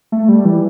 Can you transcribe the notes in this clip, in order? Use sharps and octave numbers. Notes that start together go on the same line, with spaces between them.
A3
G3
E3